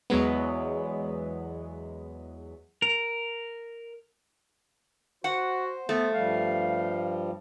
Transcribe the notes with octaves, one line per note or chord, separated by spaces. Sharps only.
E2 F#3 G#3 B3
A#4
F#4 C5 F#5
A3 B3
G2 F3 G3 F5